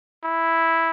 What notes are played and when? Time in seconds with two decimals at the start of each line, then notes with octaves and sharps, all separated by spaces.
0.24 E4